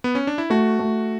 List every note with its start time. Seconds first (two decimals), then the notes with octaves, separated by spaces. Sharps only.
0.04 B3
0.15 C#4
0.27 D4
0.38 E4
0.50 A3 F#4
0.79 A3